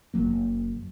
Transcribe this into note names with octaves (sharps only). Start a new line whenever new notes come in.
F#1 F#3 A#3